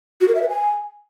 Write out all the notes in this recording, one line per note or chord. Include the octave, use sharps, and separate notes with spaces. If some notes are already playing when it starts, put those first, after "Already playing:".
F#4
A#4
E5
B4
G#5